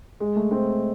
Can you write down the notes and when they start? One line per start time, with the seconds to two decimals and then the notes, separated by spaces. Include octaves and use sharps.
0.20 G#3
0.36 A3
0.51 C4